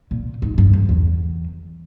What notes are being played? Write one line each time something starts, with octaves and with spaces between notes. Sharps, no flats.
A#2
G#2
G2
F2
E2